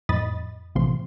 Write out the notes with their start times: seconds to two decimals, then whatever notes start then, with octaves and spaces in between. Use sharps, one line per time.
0.09 F2 A2 D#5 B5 D#6 A6
0.75 A#1 A2 C3 E3 F3 C6